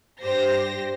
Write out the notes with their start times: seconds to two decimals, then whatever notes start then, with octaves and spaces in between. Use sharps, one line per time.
0.21 G2 G4 C5 A#6